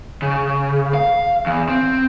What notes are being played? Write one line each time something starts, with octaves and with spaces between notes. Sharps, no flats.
C#3
F5
E2
C4